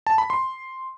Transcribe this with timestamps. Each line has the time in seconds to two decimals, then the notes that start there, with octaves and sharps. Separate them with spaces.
0.07 A5
0.18 B5
0.30 C6